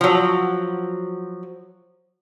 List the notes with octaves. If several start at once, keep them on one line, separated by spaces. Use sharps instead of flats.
F3 F#3